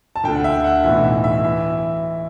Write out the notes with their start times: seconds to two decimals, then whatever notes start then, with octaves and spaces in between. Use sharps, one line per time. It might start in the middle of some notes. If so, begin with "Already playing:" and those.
0.16 A5
0.24 D2 D3 G5
0.35 F#5
0.44 E5
0.64 F#5
0.84 B1 A2 E3 E5
1.04 E5
1.24 E5
1.44 E3 E5